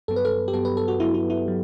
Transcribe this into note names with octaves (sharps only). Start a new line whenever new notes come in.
G2 F#3 B3 A4
B4
A4
G4
G2 F#3 B3 A4
B4
A4
F#4
G2 F#3 B3 E4
E4
E4
F#3